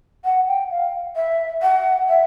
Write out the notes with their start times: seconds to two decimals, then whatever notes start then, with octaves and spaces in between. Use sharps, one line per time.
0.25 F#5
0.47 G5
0.71 F5
1.16 E5
1.62 F#5
2.08 E5